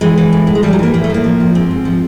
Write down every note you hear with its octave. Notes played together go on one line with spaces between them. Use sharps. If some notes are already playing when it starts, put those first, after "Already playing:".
E3 G#3
E3
A2
A2
G#3
E3 G3
F#3
E3 A#3
A2 A#3
A3
A2 A#3
F3
F3
G#2 C4
G#2
F3